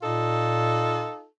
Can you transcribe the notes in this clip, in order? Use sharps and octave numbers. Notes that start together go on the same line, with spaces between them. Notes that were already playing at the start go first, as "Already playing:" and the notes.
A#2 D#4 F4 A4